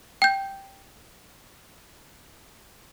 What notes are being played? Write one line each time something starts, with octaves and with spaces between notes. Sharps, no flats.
G5 G6